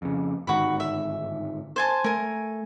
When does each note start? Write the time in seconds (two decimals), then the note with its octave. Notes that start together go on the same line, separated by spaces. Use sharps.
0.02 F2 C#3
0.47 G1 G#2 D#3 F#4 B5
0.80 E5
1.76 C5 G#5 A5
2.04 A3 A#4 G#5